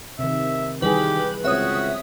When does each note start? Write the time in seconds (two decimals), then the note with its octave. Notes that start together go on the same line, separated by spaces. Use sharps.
0.19 C3 D#3 E5
0.82 D#3 E3 G3 G4 G#4 B4
1.45 C#2 C4 F#4 C#5 E5 D#6